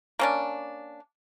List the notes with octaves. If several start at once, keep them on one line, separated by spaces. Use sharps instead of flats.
A#3 C#4 D4